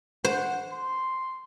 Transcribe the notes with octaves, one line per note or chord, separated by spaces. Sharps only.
C5 F#5
C6